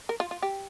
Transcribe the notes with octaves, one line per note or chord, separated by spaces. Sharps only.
A#4
F4
F4
G4